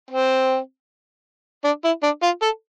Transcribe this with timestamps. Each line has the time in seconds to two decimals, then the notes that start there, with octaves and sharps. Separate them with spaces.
0.11 C4
1.65 D4
1.84 E4
2.03 D4
2.23 F4
2.42 A4